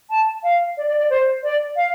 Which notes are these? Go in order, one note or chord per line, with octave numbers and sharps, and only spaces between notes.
A5
F5
D5
D5
D5
C5
D5
F5